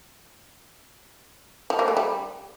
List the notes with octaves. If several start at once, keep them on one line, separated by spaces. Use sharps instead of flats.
F3
A#3
A3
G3